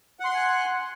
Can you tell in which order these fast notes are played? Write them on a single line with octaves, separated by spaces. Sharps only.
F#5 C6 F#6 G#5